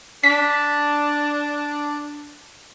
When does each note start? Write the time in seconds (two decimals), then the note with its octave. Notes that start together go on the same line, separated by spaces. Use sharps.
0.24 D4 B6